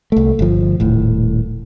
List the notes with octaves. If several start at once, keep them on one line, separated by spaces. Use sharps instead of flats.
C2 A3
G1 F3
D#1 A2